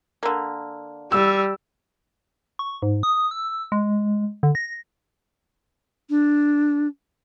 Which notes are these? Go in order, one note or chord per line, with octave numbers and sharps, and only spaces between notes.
D3 A#3
G3 E6
C#6
G#2
D#6
E6
G#3
D3
A#6
D4